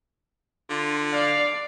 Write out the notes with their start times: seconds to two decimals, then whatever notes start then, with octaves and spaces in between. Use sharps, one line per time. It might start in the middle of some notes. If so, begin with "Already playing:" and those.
0.70 D3 F4
1.13 D5 F5